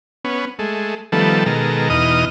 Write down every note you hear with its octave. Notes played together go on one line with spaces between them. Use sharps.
B3 C#4
G#3 A3
D#3 F3 G3 A3 B3 A4
B2 D#3 G#3 A4 A#4
E2 B2 D#4 D#5 D#6 F6